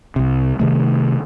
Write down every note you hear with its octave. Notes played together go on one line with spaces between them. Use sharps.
C2 C3
C3 D#3 A3